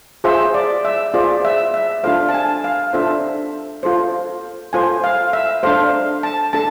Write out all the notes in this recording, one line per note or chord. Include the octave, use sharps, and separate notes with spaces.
F4 G#4 C5 E5
D5
E5
F4 G#4 C5 D5
E5
E5
D4 F4 A4 C5 F5
A5
G#5
F5
D4 F4 A4 C5 E5
F4 A4 C5
F4 A4 C5 G#5
F5
E5
D4 A4 C5 F5
A5
D4 A4 A5